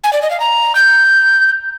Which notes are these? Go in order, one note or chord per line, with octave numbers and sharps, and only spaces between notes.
G#5
D5
D#5
F5
A#5
G6